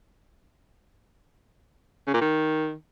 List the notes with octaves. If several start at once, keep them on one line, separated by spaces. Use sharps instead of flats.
C#3
A#2
D#3